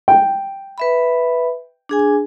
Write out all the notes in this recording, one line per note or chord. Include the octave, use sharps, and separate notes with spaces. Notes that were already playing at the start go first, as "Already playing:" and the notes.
G5
B4 E5 B5
D4 G#4 G#5